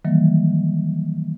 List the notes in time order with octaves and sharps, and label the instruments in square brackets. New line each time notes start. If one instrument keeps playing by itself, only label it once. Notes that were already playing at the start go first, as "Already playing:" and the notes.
[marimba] D#3 E3 F#3 G3 A#3